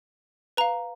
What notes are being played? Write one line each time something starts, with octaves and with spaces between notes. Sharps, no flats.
B4 F5 A#5